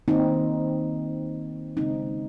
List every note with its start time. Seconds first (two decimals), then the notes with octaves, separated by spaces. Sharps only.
0.08 D#3 A#3 C4 D#4
1.77 C#3 G#3 C4 D#4